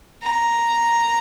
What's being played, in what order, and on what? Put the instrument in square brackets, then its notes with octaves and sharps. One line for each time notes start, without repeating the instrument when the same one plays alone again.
[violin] A#5